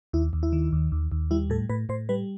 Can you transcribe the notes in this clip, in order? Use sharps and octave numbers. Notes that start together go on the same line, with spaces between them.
D#2 E4
D#2
E4
D#3
D#2
D#2
D#2
G3 E4
A2 A4
A2 B4
A2 C5
G3 B4